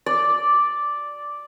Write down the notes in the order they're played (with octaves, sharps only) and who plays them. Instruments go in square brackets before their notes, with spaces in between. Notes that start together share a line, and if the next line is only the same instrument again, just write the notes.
[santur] D5